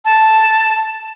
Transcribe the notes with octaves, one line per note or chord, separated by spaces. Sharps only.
A5